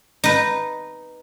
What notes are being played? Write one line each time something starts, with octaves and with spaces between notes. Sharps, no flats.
D#4 B4